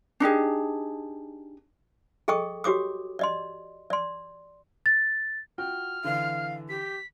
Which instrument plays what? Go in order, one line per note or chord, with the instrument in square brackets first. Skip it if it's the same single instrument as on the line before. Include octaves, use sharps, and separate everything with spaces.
[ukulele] D4 D#4 G4 G#4
[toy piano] G#4 A4 D#5 G5 C#6 D#6
F#4 G4 C#5 D6 D#6
D5 D#5 C6
D5 C6
[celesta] A6
[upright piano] F4 F#4 G5 [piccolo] F6
[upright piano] D3 E3 [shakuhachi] F5
[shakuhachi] G4 [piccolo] B6